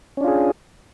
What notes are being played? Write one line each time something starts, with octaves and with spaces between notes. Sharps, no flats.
C#4 D4 F4 G#4